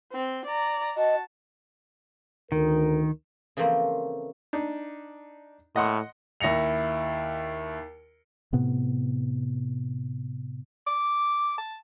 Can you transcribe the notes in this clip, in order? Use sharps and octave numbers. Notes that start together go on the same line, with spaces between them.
C4
D5 A#5
F#4 D#5 A5
D2 D#3 A#4
C#3 E3 F3 A3 A#3 C4
D4 D#4
A2 D#5 F#5 C6
D#2 E4 A#6 C#7 F7
A2 C3 B3
D6
A5